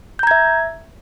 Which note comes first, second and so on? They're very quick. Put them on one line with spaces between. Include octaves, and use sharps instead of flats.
G6 A#5 G#6 E5